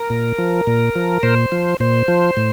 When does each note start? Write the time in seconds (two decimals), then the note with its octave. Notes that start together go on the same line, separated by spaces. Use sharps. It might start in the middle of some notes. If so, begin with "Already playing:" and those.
Already playing: A#4
0.10 A#2
0.38 F3
0.67 A#2
0.95 F3
1.23 A#2 C5
1.52 F3
1.80 A#2 C5
2.08 F3
2.37 A2